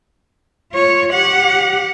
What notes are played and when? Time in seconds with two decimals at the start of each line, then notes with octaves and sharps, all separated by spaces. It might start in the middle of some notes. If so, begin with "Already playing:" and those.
0.72 F4 C#5
1.13 G4 F#5